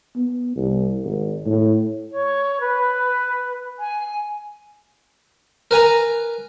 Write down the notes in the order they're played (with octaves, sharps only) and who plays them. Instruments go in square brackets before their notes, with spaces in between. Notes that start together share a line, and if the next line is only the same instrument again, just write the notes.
[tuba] B3
C2
G#1
A2
[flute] C#5
B4
G#5
[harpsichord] A#4 B4 G#5 A#5